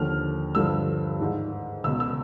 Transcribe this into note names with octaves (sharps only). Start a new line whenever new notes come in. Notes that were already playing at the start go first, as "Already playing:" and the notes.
Already playing: D#2 D3 F3 F6
G2 D3 F3 E6
G#2 D#3
C#2 B2 E6
E6